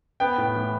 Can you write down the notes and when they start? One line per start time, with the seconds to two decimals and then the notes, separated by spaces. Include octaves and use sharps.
0.20 B3 G5
0.38 A2
0.56 E3